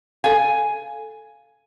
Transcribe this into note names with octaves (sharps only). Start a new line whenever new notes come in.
A4 F5 G#5